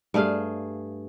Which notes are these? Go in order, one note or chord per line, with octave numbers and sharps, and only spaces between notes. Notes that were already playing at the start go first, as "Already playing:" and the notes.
G2 A3 G#4 F5